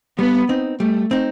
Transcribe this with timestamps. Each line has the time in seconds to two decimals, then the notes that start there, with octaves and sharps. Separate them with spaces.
0.18 G3 B3
0.49 C4 D#4
0.80 G3 A3
1.11 C4 D#4